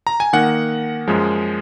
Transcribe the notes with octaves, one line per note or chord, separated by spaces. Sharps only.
A#5
G#5
D#3 A#3 D#4 F#5
F#2 F3 G#3